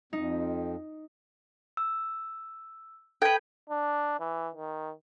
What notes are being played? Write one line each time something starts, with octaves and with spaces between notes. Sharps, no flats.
F2 D#4
E6
A4 B4 G5 G#6
D4
E3
D#3